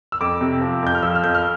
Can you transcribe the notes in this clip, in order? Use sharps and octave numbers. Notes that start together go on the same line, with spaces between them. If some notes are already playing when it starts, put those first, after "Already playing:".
E6
F2 D6
C3
F3
F2 G6
F6
F3 E6
F6
F2 G6
F6